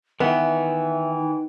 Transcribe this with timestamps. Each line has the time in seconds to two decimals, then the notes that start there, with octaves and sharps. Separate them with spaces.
0.20 D#3 E3 B3 E5
1.18 D#4